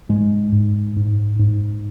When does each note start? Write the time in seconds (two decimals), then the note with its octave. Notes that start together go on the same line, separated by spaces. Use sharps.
0.09 G#2 G#3
0.52 G#2
0.97 G#2
1.39 G#2